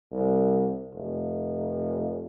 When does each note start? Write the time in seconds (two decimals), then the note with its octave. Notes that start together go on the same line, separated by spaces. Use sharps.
0.12 C2
0.95 F1